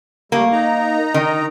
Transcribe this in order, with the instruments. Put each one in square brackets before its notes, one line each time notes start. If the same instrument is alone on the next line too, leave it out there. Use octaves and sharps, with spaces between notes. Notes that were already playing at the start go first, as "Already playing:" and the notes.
[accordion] G3 A3 [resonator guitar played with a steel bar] A#3
[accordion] D#4 A#5
[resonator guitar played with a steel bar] D#3